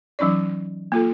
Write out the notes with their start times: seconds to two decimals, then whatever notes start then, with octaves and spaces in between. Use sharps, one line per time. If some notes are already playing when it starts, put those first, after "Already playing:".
0.19 E3 F#3 C#4 D#4 D5
0.92 A#3 F4 A4